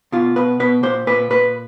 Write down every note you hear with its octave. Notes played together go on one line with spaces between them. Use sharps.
B2 F4
B2 B4
B2 B4
A#2 C5
A#2 B4
A#2 B4